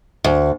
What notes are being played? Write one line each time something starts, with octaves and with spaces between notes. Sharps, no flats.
D2